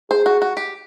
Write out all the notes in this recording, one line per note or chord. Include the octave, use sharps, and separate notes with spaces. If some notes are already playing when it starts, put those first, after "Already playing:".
G#4 C5
F#4
F#4
G4